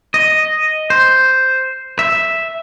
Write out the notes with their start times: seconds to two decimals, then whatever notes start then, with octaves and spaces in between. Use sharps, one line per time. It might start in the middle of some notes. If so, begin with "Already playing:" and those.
0.14 D#5
0.90 C5
1.99 E5